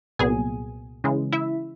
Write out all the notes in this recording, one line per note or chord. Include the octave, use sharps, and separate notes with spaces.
C2 A#2 F#3 B3 G#4 G#5
C#3 E3 G#3
E4 E5